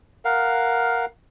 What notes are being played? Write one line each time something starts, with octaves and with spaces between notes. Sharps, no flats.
A#4 F5 F#5